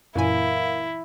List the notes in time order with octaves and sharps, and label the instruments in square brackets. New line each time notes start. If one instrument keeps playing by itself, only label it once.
[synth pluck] F#2 A#2 G#5 [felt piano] E3 [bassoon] A#3 [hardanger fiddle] E4